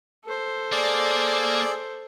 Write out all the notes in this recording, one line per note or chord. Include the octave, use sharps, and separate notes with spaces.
A4 C5
A#3 G#4 D5 E6